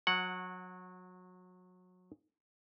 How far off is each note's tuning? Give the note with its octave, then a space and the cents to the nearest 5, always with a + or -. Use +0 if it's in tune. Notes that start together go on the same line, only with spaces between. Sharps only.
F#3 -25 F#5 +0